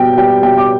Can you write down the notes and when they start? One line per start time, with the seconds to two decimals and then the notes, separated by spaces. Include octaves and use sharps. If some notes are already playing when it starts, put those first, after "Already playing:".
Already playing: B2 G3 G5
0.18 G3 G5
0.42 B2 G5
0.58 D6